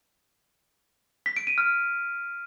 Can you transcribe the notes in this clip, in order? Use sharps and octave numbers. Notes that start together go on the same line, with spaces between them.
B6
D7
D#7
F6